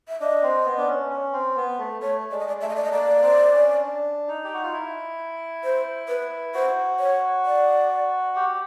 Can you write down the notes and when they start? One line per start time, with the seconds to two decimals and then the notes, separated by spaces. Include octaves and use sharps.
0.08 E5
0.20 D4 D#5
0.42 C4
0.66 B3
0.78 D4
0.87 C#4
1.10 C#4
1.33 C4
1.56 B3
1.78 A3
2.01 A3 C#5
2.31 G#3 D5
2.39 D#5
2.48 D5
2.61 A3 E5
2.69 D#5
2.76 D5
2.84 D#5
2.91 A#3 D5
3.22 C4
3.53 C#4
3.82 D4
4.28 D#4
4.44 G4
4.54 F#4
4.63 F4
4.73 E4
5.64 C5
6.09 B4
6.55 F#4 C5
6.99 C#5
7.45 D5
8.36 G4